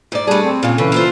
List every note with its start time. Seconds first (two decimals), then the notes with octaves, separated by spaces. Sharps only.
0.12 G#2 D5
0.27 G3 A3 D4 G#4
0.44 C4
0.63 A#2 C#3
0.78 C#3 E3 A4 B4
0.92 A#3 F4 C5